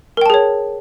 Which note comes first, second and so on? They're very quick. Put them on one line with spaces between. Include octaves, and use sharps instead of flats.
A#4 G5 A5 G#4 C#5